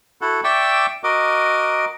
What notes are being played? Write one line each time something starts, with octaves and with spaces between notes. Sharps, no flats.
E4 F#4 A4 F#5
D5 E5 G5 C#6 D6 E6
F#4 A#4 D#5 D6